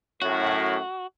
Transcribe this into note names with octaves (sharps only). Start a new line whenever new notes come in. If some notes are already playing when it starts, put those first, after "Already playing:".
F#2 A2 F#4